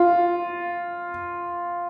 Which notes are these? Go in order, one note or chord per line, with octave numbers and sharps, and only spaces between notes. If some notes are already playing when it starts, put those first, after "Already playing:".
Already playing: F4